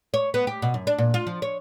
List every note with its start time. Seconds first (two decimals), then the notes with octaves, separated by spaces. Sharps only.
0.14 C#5
0.34 B3
0.47 G4
0.62 B2
0.74 F#2
0.87 D4
0.98 A#2
1.14 F4
1.27 F3
1.42 C#5